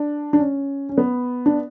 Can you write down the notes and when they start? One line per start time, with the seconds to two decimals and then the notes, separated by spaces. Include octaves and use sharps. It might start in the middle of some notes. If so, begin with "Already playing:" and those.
Already playing: D4
0.33 D4
0.39 C#4
0.89 C#4
0.97 B3
1.46 D4